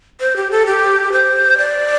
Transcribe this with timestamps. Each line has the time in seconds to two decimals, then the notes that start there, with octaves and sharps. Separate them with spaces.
0.21 C5
0.37 G4
0.51 A4
0.66 G4
1.12 C5
1.58 D5